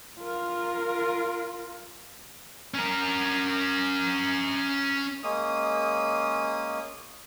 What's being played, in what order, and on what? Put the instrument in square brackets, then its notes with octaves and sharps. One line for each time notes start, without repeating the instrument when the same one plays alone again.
[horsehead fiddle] F4 A#4
[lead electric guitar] C#4 A#4
[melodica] G#3 A#3 C#4 D#6